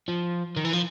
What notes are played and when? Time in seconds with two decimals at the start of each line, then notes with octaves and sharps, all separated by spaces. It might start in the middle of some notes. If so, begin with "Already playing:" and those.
0.08 F3
0.57 D#3
0.65 E3
0.73 F3